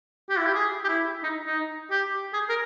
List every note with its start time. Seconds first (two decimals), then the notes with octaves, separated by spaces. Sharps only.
0.29 G4
0.37 E4
0.46 G4
0.54 G#4
0.84 G4
0.88 E4
1.23 D#4
1.45 D#4
1.91 G4
2.33 G#4
2.49 A#4